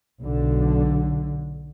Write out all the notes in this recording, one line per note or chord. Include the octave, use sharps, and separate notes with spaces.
B1 D3